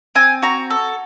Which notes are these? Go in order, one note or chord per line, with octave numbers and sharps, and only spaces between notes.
C4 G#5
F#4 A#5
A4